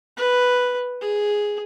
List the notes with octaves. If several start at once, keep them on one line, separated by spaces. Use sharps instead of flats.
B4
G#4